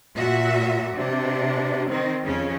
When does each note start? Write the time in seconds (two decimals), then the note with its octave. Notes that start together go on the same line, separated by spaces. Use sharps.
0.16 A#2 F#4 E5
0.95 C3 D4
1.89 D#3 C4
2.24 F2 C#3 C#4